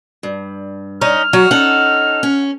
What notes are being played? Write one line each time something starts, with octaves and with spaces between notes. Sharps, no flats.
G2
C#4 D#4 F6
F#3 F#4
C#4 D#4 A4 F#5
C#4